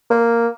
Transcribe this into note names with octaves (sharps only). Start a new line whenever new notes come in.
A#3